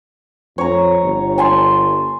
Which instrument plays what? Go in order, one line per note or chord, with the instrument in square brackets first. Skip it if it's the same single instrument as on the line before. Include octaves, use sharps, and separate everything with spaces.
[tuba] F2 [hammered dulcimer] C#5 A#5
[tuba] G1
[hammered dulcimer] G#5 A5 C6